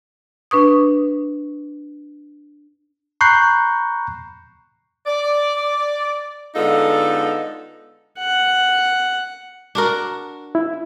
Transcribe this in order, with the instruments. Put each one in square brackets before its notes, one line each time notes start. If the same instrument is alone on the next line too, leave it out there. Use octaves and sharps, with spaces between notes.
[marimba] D4 B4 C#6 D#6
[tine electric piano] A#5 B5 C#6 F#6 G6 C7
[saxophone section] D5
D3 G#3 B3 D#4 F4 A4
[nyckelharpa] F#5
[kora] D4 F#4 A#4
[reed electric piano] E4